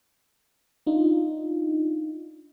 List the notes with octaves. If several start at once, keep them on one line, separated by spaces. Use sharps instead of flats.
D4 D#4 F4